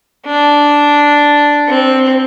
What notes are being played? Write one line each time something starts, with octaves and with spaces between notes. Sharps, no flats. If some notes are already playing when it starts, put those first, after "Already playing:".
D4
C4